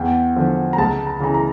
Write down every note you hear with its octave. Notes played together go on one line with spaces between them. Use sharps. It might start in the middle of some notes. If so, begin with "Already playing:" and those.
Already playing: E2 G5
D3 F3
A#5
C#2 A5
A#5
C#3 E3 A#5
A#5